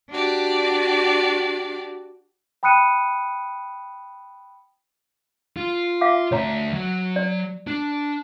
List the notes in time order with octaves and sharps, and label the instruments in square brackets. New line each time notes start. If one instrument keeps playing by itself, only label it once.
[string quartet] D4 F#4 G4 D5
[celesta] G5 B5 D#6 F#6 C#7 D#7
[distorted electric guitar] F4
[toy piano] E5 F5 D6
[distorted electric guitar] D2 E5 [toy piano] C#5 A#5
[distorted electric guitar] F#3
[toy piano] D5
[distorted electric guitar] D4